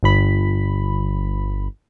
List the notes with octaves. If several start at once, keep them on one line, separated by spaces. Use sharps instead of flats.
G1 B5